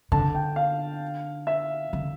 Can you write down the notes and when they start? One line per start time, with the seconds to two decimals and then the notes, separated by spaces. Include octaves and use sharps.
0.12 D3 A5
0.35 G5
0.56 F5
1.47 E5
1.93 D3